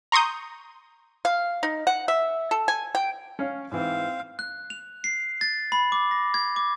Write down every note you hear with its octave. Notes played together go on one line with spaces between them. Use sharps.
A#5 C6 C#6 D#6 G6
F5
D#4
F#5
E5
A4
G#5
G5
C#4 C#5 F5
G#2 E3 C4 F5
F#6
F7
C7
A6
B5
D6
A#6
G#6
D6